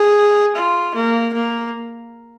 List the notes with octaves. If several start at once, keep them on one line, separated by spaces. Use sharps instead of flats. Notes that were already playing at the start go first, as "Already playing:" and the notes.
Already playing: G#4
F4
A#3
A#3